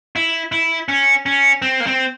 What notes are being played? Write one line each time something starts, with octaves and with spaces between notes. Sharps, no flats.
E4
E4
C#4
C#4
C4
A#3
C4